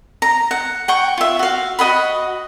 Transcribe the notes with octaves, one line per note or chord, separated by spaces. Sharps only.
A#5
F#5
F#5 G5 C#6
F4 E5
F#4 F5
F#4 D#5 F#5 B5